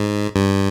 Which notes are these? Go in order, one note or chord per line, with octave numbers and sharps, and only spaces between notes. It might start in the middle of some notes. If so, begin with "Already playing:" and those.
Already playing: G#2
G2